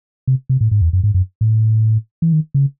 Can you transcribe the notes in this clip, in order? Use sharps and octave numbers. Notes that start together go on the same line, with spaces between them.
C3
C3
A2
G#2
E2
F#2
G#2
F#2
A2
E3
D#3
C#3